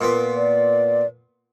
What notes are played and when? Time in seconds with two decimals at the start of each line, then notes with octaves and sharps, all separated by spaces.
0.01 A#2 B3
0.36 D5